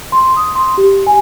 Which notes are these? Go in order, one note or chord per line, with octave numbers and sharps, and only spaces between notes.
C6
D#6
C6
G4
G#5